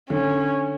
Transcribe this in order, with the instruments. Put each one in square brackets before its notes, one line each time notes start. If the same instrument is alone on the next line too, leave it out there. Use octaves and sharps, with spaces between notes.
[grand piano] D3 [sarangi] C#4